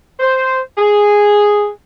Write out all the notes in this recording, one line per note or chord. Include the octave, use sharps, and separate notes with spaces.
C5
G#4